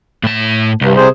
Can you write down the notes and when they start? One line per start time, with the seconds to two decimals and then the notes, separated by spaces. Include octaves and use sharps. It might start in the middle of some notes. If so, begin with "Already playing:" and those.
0.23 A2 A5
0.81 C2 G2
0.96 C3 G#4 C5